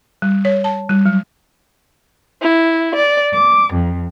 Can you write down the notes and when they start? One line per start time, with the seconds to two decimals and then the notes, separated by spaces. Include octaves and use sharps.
0.22 G3
0.45 C#5
0.64 A5
0.90 G3
1.06 F#3
2.41 E4
2.95 D5
3.34 D6
3.75 F2